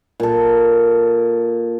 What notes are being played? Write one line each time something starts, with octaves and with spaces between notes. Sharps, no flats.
A#2 A4